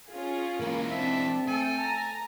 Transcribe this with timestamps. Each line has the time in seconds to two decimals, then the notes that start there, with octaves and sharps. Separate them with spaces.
0.10 C#4 F4 G#4
0.60 E3 G#3 A#3
0.90 C4 D4 E5 A5
1.48 A3 A4 G5 G#5
1.79 A5 A#5